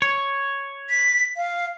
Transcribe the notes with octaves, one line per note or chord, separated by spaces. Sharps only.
C#5
B6
F5